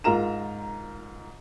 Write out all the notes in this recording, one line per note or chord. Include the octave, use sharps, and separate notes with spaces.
G#2 F4 A#4 A#5 E7